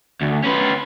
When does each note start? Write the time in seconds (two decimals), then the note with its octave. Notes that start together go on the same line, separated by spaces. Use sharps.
0.21 D2
0.43 C#4 B4